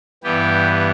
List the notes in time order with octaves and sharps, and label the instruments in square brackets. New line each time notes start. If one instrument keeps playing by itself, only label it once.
[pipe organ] G2 E3 B3 G4